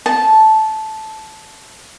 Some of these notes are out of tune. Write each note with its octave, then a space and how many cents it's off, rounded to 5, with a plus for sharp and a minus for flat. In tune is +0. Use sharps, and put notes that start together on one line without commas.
A5 -10